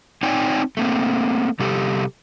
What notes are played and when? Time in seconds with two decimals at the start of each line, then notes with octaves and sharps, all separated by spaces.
0.23 C4 D#4 C#5 D5 G5 G#5
0.77 A3 A#3 C4
1.59 C3 G3 G4 A4